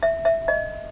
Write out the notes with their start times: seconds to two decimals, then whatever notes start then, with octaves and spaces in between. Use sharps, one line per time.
0.03 E5
0.25 E5
0.48 D#5